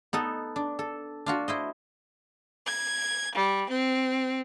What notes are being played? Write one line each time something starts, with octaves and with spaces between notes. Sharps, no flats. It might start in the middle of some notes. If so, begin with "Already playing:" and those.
B3 D#4 A4
D4
A4
D4 F4 F#4
E4 C5 D#5
G#6
G3
C4